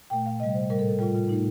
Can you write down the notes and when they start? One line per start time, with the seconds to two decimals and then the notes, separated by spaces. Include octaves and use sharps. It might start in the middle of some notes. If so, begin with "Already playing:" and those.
0.10 A#2 A3 G5
0.26 F5
0.40 C3 G3 D#5
0.55 C5
0.70 A2 G3 A#4
0.79 A4
0.89 A4
0.99 A2 G3 F4
1.14 F4
1.29 A2 A3 D#4